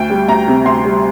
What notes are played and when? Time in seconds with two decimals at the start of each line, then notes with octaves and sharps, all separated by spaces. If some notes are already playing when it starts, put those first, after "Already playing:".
Already playing: D2 G5
0.10 G3
0.28 D2 A#5
0.48 C3
0.65 D2 C6
0.85 G3